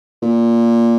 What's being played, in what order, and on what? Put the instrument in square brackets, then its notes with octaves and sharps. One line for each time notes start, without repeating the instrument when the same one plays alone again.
[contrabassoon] A#2